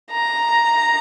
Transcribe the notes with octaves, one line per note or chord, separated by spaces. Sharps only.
A#5